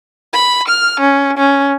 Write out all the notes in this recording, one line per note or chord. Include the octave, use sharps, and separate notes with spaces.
B5
F6
C#4
C#4